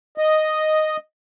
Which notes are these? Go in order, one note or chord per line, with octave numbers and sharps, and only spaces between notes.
D#5